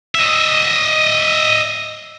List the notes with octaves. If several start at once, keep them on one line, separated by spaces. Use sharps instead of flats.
D#5 E5